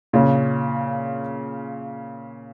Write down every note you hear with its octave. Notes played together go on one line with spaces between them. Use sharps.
A#2 C#3